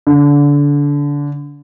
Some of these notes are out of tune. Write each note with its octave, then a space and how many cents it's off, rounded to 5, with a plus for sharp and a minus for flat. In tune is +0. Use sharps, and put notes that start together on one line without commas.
D3 -25